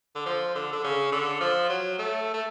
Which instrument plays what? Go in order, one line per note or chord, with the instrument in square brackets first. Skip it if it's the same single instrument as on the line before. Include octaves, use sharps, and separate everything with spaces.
[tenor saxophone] D3
F3
D3
D3
C#3
D3
F3
F#3
A3
A3